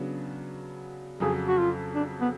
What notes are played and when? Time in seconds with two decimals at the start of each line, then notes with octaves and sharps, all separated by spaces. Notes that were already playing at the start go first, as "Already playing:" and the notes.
Already playing: C#3 F#3 B3 D4
1.20 F2 C#3 F#3 G#4
1.48 F#4
1.58 F4
1.95 D4
2.21 B3